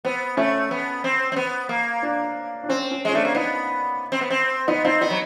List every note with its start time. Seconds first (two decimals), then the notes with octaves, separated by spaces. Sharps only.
0.05 B3 C4
0.37 A3 C#4
0.71 B3
1.04 C4
1.32 C4
1.36 B3
1.69 A#3
2.03 D4
2.63 D4
2.69 C4 C#4
2.91 C#4
3.05 G#3 C#4
3.13 A3 D4
3.25 A#3
3.35 B3 D#4
4.12 C4
4.21 B3
4.30 C4
4.68 B3 D#4
4.85 C4 D#4
5.01 B3 D#4
5.10 F#3